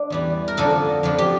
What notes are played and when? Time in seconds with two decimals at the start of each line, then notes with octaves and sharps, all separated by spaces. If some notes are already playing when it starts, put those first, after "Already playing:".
Already playing: D4
0.10 E2 E3 G3
0.48 A#4
0.57 F2 D3 F3 A4
1.03 F2 D3 F3
1.18 G4